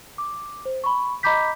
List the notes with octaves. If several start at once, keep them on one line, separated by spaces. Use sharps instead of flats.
D6
C5
B5 C#6
D#5 A#5 B5 D6 G6 B6